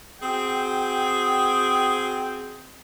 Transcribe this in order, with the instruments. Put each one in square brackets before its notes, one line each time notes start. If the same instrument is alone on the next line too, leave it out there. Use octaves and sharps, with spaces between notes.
[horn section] C4 F#4 G#4 G5